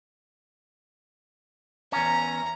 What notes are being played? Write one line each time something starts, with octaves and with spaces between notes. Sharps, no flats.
E2 C#4 A#5